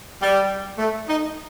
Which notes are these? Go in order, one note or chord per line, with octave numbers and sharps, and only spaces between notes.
G3
A3
D#4